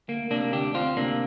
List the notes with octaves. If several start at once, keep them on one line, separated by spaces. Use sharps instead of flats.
D2 A#3
C3 A#3 D4
D2 D4 G4
D2 C4 F4
C3 A#3 D4